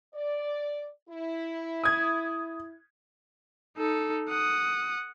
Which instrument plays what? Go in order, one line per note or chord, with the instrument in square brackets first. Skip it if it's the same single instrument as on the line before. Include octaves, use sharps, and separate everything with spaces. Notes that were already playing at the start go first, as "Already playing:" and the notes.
[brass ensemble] D5
E4
[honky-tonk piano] D#6 G#6
[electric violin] D#4 A4
F#5 D#6